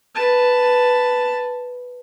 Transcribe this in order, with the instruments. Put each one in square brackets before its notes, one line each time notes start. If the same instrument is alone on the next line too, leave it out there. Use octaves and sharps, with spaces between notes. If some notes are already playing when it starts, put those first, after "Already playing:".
[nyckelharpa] B4 A5